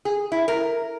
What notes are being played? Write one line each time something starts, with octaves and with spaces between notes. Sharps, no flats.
G#4
E4
A#4